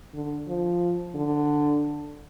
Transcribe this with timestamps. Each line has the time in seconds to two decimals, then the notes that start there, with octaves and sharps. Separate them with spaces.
0.14 D3
0.48 F3
1.15 D3